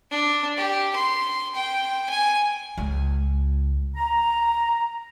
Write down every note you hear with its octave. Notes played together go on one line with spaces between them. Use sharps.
D4
G4
C6
G5
G#5
C#2 G#3
A#5